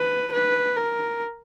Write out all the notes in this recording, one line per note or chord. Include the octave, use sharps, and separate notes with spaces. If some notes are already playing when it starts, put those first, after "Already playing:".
Already playing: B4
B4
A#4